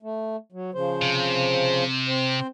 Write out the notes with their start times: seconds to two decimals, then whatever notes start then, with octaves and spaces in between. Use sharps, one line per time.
0.03 A3
0.52 F#3
0.75 C#3 F3 C5
1.02 C3
2.08 C4 C5